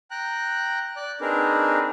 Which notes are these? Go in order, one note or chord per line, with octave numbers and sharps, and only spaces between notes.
G5 A#5 F#6
D5 F#6
C4 D4 D#4 G#4 A#4 B4